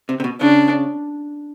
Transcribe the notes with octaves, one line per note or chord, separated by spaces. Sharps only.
C3
C3
B2
C#3 D4